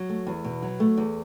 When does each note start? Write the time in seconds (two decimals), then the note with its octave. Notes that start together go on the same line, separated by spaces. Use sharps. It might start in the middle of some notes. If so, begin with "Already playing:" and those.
Already playing: F#3
0.09 A3
0.27 E2
0.44 B2
0.62 F#3
0.80 A3
0.97 E2